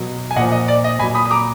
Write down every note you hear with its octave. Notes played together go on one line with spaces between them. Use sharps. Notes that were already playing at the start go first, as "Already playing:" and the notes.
Already playing: B2 F#3
G#5
A#2 F3 D#5 F#5
D#5
D5
D#5
A#2 F#3 G#5 B5
B5 D#6
D#6
A#5 D6